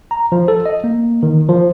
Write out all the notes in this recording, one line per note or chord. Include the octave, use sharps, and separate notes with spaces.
A#5
F3
A4
D#5
A#3
D#3
F3